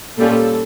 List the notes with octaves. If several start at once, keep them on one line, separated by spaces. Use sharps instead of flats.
A#2 G3 A#3 C#4 F4 A4